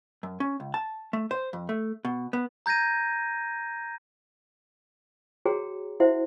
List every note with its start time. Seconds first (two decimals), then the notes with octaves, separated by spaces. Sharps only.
0.23 F#2
0.40 C#4
0.60 C#2
0.74 A5
1.13 A3
1.31 C5
1.53 F2
1.69 A3
2.05 B2
2.33 B3
2.66 A#5 G6 G#6 A#6 D#7
5.45 F#4 G#4 C#5 G5 A#5
6.00 E4 F#4 C5 E5 F#5